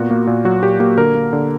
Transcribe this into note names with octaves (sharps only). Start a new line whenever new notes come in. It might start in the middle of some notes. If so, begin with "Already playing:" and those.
Already playing: A#2 B3 F#4
A#3
A#2
F#3 F#4
A#2 G4
A#3 G4
D3 A#4
A#3
D3